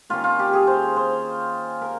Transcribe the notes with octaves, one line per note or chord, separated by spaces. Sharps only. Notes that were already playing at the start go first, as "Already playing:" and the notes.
D#3 A#3 C#4 F4
F4
G4
G#4
C5
C5
A#4